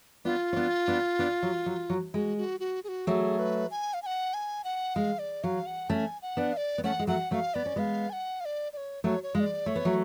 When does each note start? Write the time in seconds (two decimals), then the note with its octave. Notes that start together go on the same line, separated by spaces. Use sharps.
0.25 B3 D4 F4
0.53 C#4
0.56 B3 D4
0.88 B3 D4
1.19 B3 D4
1.43 F#3
1.66 F#3
1.90 F#3
2.14 G#3 F#4
2.38 F#4
2.60 F#4
2.84 G#4
2.89 F#4
3.07 F#3 A3 G#4
3.39 B4
3.71 G#5
3.94 F5
4.02 G#5
4.06 F#5
4.34 G#5
4.64 F#5
4.95 G#3 F5
5.19 D5
5.44 F#3 F5
5.67 F#5
5.90 A3 C#4 A5
5.95 G#5
6.22 F#5
6.37 B3 D4
6.52 F5
6.57 D5
6.78 B3
6.84 A3 C#4 F#5
6.99 G#3
7.07 F#3 A3 F#5
7.31 F#3 A3 F#5
7.34 F5
7.54 B3 D5
7.66 C#4
7.76 G#3 B3 F5
8.10 G#5
8.13 F#5
8.40 F5
8.45 D5
8.73 D5
8.77 C#5
9.04 F#3 A3 C#5
9.23 C#5
9.35 G#3 F5
9.40 D5
9.66 A3 C#5
9.76 B3
9.85 F#3 A3